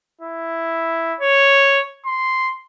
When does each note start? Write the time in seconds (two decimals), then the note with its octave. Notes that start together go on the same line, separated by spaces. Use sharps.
0.21 E4
1.20 C#5
2.06 C6